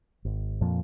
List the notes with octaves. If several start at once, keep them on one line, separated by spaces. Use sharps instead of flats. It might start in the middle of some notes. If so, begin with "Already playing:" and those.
G#1
F2 A#2 F3